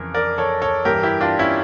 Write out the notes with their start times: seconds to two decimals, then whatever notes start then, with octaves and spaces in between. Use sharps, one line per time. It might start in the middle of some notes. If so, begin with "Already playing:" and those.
Already playing: F2 C#3 E3 A#4
0.14 A#4 D5
0.38 A4 C#5
0.62 A4 C#5
0.85 G2 E3 G4 A#4
1.03 E4 G4
1.21 D4 F4
1.39 C#4 E4